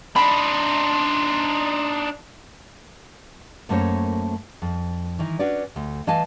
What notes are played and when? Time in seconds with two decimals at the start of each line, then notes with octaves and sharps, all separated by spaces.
0.16 D4 D#4 B5 C6
3.69 F#2 A3 A#3 C#4 C5 C#5
4.62 F2
5.19 D#3 E3
5.39 C#4 D4 F#4 B4 D5
5.76 D2
6.07 E3 D#5 F5 G#5 A5